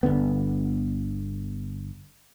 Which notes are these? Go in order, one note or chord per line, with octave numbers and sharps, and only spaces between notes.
G1 F2 D3 B3